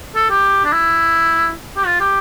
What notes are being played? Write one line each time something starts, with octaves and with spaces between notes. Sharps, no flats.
A4
G4
D4
E4
G4
F4
G4